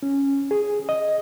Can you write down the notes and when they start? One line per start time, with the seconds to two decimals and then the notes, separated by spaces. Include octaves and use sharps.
0.03 C#4
0.51 G#4
0.89 D#5